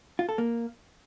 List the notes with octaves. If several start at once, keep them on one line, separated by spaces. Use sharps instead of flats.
F4
A4
A#3